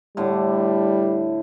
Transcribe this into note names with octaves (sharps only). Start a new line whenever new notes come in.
A2 D3 G3